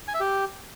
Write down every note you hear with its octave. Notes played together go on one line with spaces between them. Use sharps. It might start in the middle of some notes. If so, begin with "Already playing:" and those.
G#5
E5
G4